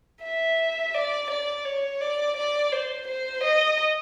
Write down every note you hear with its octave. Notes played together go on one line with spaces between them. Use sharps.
E5
D5
D5
C#5
D5
D5
C5
C5
D#5